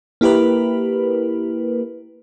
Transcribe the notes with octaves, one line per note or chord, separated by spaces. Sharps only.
A#3 E4 G4 A#4 B4